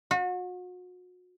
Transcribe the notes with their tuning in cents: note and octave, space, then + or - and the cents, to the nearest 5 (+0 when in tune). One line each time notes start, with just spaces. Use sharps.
F#4 -35